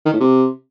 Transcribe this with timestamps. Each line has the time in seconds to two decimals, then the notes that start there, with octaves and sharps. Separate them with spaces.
0.06 D#3
0.13 A2
0.20 C3